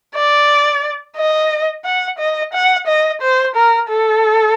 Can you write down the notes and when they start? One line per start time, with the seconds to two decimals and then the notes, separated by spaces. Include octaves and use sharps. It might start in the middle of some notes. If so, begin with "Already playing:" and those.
0.15 D5
1.17 D#5
1.84 F#5
2.18 D#5
2.53 F#5
2.87 D#5
3.21 C5
3.55 A#4
3.88 A4